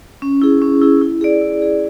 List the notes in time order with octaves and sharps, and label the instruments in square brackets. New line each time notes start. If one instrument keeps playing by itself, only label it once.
[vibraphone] C#4
E4 G#4
C#4
E4 G#4
E4
G#4 D5
E4
G#4 D5